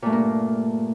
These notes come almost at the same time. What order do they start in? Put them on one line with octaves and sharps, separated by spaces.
A#2 A3 G2 A#3